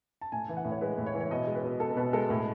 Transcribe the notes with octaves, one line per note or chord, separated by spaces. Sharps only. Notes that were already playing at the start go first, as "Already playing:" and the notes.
A5
A2 G#5
E3
F#5
A2
C#5
G#3 B4
A2
C#5
E3
C#5
B2 D#5
G#3
B4
B2
B3 A4
B2 B4
G#3 A4
A2 A4